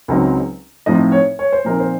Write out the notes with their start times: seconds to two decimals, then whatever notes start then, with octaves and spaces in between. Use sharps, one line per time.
0.08 C#2 C#3 F#3 C4 D#4
0.86 A2 F3 C4 D#4 D#5
1.12 C#5
1.39 C#5
1.52 C5
1.65 A#2 F3 C4 D#4 A#4
1.80 C5